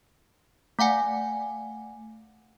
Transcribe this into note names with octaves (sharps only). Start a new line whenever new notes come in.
A3 F5 F#5 G#5